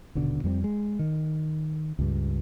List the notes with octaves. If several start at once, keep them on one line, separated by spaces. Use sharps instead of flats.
D#1 B2 D3
F2 G3 A#3 C4
G#3
D#3
C#2 G2